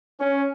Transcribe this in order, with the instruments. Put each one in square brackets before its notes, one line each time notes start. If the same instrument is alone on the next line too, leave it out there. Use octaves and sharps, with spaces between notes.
[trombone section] C#4